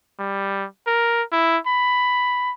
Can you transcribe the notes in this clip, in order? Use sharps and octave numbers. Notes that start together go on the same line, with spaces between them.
G3
A#4
E4
B5